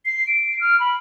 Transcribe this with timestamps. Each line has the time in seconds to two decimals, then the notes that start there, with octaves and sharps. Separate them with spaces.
0.05 C7
0.27 D7
0.61 F6
0.80 B5